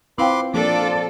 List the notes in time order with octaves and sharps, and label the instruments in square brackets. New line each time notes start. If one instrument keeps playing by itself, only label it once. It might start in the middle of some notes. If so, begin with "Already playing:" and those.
[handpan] C4 F4 [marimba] E4 F5 G5 [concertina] B4 C6 D6
[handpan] F3 A#3 [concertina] D4 D6 [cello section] F4 A4 D5